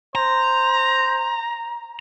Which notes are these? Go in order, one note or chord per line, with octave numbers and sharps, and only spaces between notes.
C5 A#5